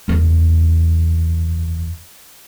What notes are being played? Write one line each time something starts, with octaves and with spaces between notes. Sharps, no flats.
F#1 E2